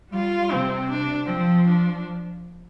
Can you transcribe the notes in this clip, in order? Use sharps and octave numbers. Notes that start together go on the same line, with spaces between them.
G3 F4
C3 C4
D4
F3 C4
D4